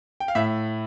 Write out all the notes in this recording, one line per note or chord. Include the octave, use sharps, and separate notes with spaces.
G5
F5
A2 E5